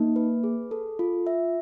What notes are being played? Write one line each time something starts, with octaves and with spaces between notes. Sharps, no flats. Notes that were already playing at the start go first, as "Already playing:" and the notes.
Already playing: A#3 D#4
B4
G#4
A4
F4
E5